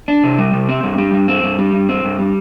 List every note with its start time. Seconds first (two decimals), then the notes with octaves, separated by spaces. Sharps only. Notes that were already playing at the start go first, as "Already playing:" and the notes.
0.08 D4
0.24 C3
0.38 G3
0.53 C3
0.69 C4
0.83 G2
0.98 G3
1.14 G2
1.28 C4
1.43 G2
1.58 G3
1.73 G2
1.89 C4
2.04 G2
2.19 G3